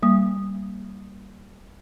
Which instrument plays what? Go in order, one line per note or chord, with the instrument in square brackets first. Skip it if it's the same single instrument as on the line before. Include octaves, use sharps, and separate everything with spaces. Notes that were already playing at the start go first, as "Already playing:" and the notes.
[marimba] G3 A#3 D#6